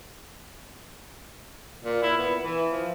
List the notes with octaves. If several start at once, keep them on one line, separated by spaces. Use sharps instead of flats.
A#2
E4
B3
E3
F3